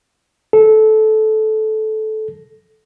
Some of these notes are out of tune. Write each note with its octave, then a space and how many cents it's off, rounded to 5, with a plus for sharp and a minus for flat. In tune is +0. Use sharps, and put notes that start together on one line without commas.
A4 -15